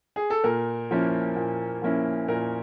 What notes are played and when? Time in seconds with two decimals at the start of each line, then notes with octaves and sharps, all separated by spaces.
0.16 G#4
0.30 A4
0.44 A#2 A#4
0.91 F3 A#3 C#4 E4
1.36 A#2
1.82 F3 A#3 C#4 E4
2.28 A#2 A#4